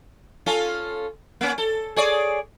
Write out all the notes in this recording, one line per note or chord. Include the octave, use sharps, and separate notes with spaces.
C#4 F4 A4
A#3 C#4
A4
G#4 C#5 D5